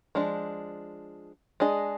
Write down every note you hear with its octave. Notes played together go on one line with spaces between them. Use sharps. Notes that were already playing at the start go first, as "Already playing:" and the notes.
F3 G#3 D4
G#3 D4 G#4 D#5